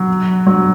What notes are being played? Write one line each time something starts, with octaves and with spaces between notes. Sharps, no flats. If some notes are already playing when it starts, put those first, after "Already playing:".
Already playing: F#3
F#3